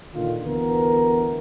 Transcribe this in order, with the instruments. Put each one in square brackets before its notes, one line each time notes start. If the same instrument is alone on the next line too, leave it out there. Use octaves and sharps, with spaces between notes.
[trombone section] A#2 D3 D#3 F4
D2 D3 E3 B3 A#4